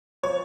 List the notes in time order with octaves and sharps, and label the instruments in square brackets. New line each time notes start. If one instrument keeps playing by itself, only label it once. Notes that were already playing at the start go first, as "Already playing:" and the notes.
[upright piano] F3 C#5